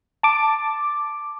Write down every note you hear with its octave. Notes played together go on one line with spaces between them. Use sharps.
A5 D6